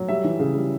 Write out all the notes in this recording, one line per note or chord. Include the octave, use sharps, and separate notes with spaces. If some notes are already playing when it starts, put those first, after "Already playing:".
Already playing: F#3
G3 E5
E3
C#3
G3